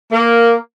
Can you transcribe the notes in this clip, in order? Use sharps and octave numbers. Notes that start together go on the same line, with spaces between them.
A#3